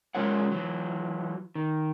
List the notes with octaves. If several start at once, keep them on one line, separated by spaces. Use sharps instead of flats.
C#3 G#3 F4 A#4 C#5 F#5
E3 F#3
D#3